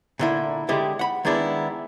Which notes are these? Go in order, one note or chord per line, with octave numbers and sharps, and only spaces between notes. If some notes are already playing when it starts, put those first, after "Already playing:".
A#2 D3 E4
D3 G#3 E4 G4
F#5 B5
D#3 G#3 B3 D4 E4